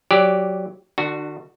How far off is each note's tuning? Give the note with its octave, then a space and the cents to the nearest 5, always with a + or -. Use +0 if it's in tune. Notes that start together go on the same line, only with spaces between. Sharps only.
F#3 +0 G4 +0 D5 -10
D3 +45 D4 +20 F#4 +0